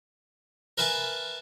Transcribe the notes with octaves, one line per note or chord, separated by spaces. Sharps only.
A#4 B4 E5 F5 G#5 A5